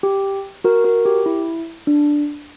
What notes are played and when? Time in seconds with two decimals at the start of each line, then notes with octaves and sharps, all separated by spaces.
0.03 G4
0.64 F#4 A#4
0.85 F#4 A#4
1.05 G4
1.26 E4
1.87 D4